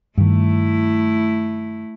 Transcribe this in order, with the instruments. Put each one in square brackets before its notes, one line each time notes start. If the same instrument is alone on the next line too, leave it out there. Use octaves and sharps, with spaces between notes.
[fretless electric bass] G2 D#3 [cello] A3 E4